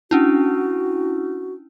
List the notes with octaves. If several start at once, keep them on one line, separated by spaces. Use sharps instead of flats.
C#4 D4 E4 F#4